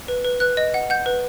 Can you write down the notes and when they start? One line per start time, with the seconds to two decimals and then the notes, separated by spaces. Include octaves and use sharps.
0.08 B4
0.25 B4
0.40 B4 F#6
0.57 D#5
0.74 F#5
0.90 F#5 G6
1.06 B4